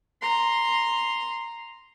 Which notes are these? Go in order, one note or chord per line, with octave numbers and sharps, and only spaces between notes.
A#5 C6